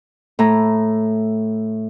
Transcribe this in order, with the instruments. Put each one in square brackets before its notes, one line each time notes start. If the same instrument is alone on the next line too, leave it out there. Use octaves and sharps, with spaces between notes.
[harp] A2 A#5